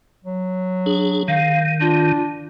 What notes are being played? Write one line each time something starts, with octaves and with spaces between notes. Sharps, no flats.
F#3
D4 G#4
D#3 F5
D4 F4